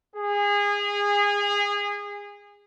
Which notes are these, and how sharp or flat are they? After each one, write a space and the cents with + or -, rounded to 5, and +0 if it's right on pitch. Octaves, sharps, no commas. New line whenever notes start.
G#4 -25